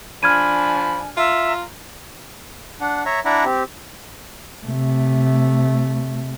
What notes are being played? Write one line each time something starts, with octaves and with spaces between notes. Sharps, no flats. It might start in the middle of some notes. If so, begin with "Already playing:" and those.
F3 D4 G#5 B5 F6 G#6 D#7
F4 E5 A#5
D4 F#5
C#5 E5 A#5
D4 E4 D5 E5 F#5 A#5
C4 G4
C3 A3